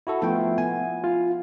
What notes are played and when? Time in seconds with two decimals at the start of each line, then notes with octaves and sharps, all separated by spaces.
0.07 E4 F#4 A4
0.22 F3 A3 B3 E4 F4 G5
0.58 B3 G#5
1.04 F4